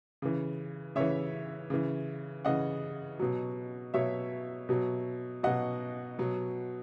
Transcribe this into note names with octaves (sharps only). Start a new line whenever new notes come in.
C#3 E3
C#3 E3 C#5 E5
C#3 E3
C#3 E3 D#5 F#5
B2 F#3
B2 F#3 C#5 E5
B2 F#3
B2 F#3 D#5 F#5
B2 F#3